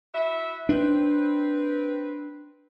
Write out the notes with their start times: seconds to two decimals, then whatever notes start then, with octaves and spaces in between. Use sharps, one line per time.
0.13 E4 F#4 E5
0.69 C4 D4 B4